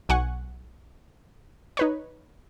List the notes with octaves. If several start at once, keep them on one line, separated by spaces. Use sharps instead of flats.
B1 F#5 G#5 C#6
D#4 B4 C#5